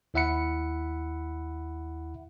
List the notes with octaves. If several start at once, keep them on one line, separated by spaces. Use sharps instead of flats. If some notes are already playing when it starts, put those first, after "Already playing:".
D#2 E4 E5 F#5 B5 C#7